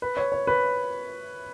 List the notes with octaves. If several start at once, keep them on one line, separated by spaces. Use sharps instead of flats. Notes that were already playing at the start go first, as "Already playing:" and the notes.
B4
C#5
C#5
B4